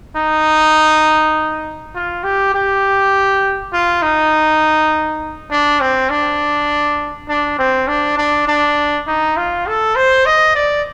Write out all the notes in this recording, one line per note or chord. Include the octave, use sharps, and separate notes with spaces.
D#4
F4
G4
G4
F4
D#4
D4
C4
D4
D4
C4
D4
D4
D4
D#4
F4
A4
C5
D#5
D5